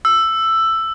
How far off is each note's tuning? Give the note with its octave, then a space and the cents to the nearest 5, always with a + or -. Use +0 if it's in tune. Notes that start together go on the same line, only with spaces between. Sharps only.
E6 +10